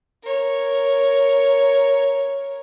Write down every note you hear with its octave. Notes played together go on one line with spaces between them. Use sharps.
A#4 C#5